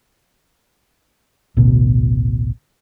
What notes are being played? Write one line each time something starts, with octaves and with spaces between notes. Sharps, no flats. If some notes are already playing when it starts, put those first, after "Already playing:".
A1 D2 B2